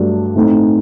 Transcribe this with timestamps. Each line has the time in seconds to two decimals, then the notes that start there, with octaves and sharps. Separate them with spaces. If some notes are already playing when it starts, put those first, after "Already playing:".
Already playing: G2 F#3 A3 D4
0.35 A2 A3 C4 D#4